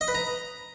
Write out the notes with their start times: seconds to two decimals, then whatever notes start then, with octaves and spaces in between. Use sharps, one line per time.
0.01 D#5
0.08 B4
0.15 A#5